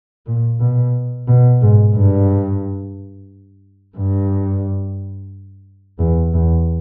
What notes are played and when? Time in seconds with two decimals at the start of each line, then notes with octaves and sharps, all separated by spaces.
0.26 A#2
0.60 B2
1.28 B2
1.62 G#2
1.95 G2
3.97 G2
5.99 E2
6.34 E2